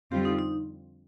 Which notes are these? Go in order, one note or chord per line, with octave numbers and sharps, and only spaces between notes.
F2 D3 G3 C4 F4 G4
D#4
D#4